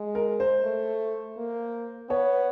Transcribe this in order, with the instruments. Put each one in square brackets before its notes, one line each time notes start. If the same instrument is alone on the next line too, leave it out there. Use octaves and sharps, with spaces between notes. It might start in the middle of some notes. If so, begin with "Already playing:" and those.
Already playing: [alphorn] G#3
[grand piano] A#4
C5
[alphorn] A3
A#3
[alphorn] B3 [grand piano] C#5